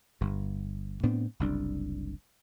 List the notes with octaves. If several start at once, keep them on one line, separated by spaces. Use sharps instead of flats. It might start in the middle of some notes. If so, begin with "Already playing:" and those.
G1 G2
A2 B3 C4 D4
F#1 C2 D4